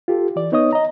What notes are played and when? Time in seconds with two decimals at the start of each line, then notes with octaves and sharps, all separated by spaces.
0.08 F4 G4 A4
0.36 E3 D5
0.52 B3 D#4 C#5 D#5 D#6
0.73 D#5 A#5